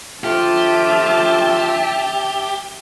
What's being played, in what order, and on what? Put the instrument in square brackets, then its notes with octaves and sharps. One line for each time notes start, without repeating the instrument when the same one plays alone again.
[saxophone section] F3 A3 F4 [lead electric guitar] G4 [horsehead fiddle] E5 A5